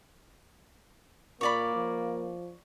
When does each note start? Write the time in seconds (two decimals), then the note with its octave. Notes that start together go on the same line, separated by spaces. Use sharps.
1.41 A#2 A#3 C#5 D5 B5
1.75 F3